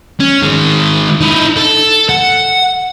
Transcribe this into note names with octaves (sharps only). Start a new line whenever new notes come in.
C#4
D#3 G#3
D#4 E4
A4
F#5